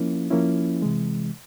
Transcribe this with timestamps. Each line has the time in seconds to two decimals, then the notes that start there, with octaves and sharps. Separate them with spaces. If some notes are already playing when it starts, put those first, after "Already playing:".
Already playing: F3 A#3 C#4 E4
0.30 F3 A#3 C#4 E4
0.82 C3 E3 G#3